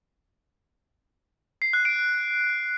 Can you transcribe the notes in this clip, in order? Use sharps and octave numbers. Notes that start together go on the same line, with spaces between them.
C7
F#6
D7